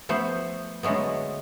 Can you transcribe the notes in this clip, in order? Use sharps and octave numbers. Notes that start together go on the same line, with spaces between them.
F3 A3 B3 C5
D3 F#3 G#3 A3 B3